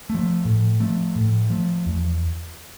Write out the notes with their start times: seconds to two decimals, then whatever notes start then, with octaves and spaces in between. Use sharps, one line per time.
0.10 F3 A3
0.45 A2
0.80 F3 A3
1.16 A2
1.50 F3 A3
1.86 E2